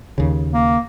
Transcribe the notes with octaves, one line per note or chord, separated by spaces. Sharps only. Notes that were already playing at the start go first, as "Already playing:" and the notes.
D#2 C#3
A#3